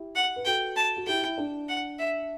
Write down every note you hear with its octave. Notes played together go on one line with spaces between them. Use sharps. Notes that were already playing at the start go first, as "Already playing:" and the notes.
Already playing: E4 G4
F#5
B4
F#4 A4 G5
A5
F#4
E4 G4 G5
E4
D4
F#5
E5